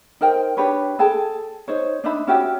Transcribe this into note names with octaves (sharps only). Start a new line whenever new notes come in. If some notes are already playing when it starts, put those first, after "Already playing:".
D#4 A#4 C5 G5
D4 G4 B4 C#5
G#4 A4 G5 A5
D#4 C5 C#5
D4 D#4 E5 B5
C#4 F#4 G4 E5